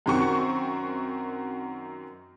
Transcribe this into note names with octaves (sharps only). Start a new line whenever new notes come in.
F#2 D#3 C4 F#4 C#6 C#7